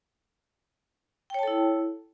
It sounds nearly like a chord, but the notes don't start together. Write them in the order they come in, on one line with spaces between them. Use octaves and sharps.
G5 C#5 A5 A4 E4